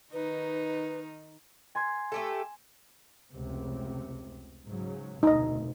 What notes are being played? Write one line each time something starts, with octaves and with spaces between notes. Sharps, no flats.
D#3 D#4 B4
G#5 C6 G#6
A3 G4 A4
F1 C#2 C3
G#2 C#3 F#3
F1 D2 B2 D#4 D#5